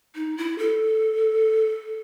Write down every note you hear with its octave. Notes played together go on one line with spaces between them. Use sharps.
D#4
E4
A4